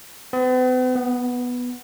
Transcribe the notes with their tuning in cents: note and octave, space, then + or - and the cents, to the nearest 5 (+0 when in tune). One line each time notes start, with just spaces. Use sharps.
B3 +45
B3 -5